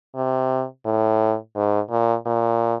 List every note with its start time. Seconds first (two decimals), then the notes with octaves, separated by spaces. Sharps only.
0.15 C3
0.86 A2
1.55 G#2
1.91 A#2
2.26 A#2